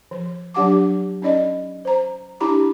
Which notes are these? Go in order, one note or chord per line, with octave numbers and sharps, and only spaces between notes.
F3
F#3 D4 G4 F#5 A5 D6
C#4 D#4 D5 D#5
C5 A#5
D4 E4 G4 A#5 B5 D6